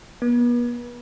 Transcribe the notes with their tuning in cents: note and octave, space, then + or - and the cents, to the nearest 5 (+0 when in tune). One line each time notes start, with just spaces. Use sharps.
B3 -40